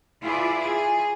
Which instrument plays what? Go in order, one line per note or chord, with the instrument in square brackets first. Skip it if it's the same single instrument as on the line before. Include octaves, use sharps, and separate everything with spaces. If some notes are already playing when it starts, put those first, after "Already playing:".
[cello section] E4 F4 G#4 B4 D5
G#4